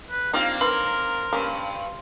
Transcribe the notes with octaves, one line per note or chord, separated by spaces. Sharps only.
B4
A#3 C4 D4 D#4 F4 G4 F5
D#3 A#4 B4 C6
G2 A#3 C#4